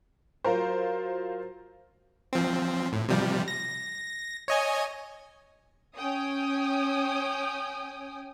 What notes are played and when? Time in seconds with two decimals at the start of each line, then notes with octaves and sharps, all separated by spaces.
0.45 F#3 F4 A#4 C5
2.33 F3 C4
2.93 A2
3.09 C3 F3 G3
3.48 A#6
4.48 C#5 D#5 G#5
5.96 C#4 G5 G#5 D#6